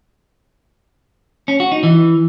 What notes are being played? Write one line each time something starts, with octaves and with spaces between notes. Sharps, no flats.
C#4
F#4
D#4
E3